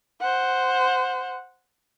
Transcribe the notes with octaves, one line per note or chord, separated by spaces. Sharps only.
C5 F#5